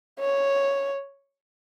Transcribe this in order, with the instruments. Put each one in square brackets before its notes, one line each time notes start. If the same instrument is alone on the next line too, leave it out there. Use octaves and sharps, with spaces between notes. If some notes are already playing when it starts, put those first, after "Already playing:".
[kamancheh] C#5